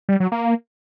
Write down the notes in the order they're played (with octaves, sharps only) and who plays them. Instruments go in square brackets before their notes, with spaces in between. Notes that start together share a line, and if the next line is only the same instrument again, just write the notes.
[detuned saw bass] G3
F#3
A#3